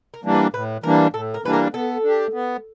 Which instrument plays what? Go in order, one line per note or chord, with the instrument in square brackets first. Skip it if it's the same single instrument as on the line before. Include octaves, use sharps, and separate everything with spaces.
[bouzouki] A#4
[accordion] E3 G3 A#3 D4
[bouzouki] B4
[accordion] A2 [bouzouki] B4
[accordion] E3 G3 A#3 D4 [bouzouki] A#4
[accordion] A2 [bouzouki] A4
[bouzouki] A#4
[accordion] E3 G3 A#3 D4 [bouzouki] B4
[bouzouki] A#4
[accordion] B3 [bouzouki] A4
[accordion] D4 G4
B3